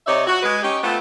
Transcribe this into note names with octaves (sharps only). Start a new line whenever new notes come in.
C3 D#4 C#5 D5 E5
F#4
G#3 B4
C#4 D#4 G4
A3 B3 C4 F4 A4